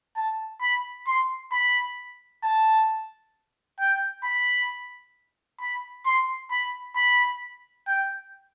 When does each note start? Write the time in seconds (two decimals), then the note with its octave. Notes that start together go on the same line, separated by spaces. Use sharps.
0.16 A5
0.62 B5
1.07 C6
1.52 B5
2.44 A5
3.80 G5
4.24 B5
5.60 B5
6.06 C6
6.51 B5
6.96 B5
7.87 G5